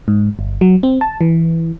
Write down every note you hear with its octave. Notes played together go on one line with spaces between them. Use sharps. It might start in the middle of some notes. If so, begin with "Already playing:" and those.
G#2
G1
F#3
C4
A5
E3